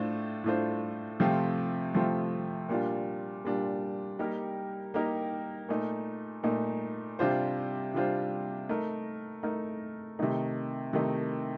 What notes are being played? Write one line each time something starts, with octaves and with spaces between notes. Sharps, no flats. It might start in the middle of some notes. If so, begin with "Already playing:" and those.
Already playing: A2 A3 D4 F4 C5
A2 A3 D4 F4 C5
C3 F3 A3 C4 F4
C3 F3 A3 C4 F4
A#2 G3 D4 F4
A#2 G3 D4 F4
G3 A#3 D#4 G4 A#4
G3 A#3 D#4 G4 A#4
A#2 A3 D#4
A#2 A3 D#4
C3 G3 D4 F4 C5
C3 G3 D4 F4 C5
A3 D#4 A#4
A3 D#4 A#4
C3 D#3 A3 D#4
C3 D#3 A3 D#4